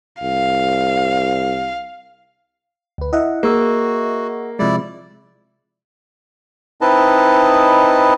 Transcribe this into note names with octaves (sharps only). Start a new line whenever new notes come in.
C2 F5
D2 B4
E4 D#5 E5 F#5
A#3 F#4 G#4 E6
C3 F3 G#3 E4 D5
C4 D#4 E4 B4 D#5 A5